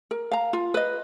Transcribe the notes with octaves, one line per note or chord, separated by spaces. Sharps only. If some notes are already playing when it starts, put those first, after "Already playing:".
A#4
F5 A#5
F4
B4 D#5